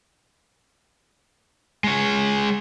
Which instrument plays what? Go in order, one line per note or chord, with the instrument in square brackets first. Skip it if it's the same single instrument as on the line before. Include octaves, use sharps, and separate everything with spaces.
[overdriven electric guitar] G#3 C#5